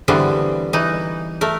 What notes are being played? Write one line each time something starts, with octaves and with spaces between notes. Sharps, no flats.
D3 E3 G3 B3 C4
E3 D#4
A3 A#4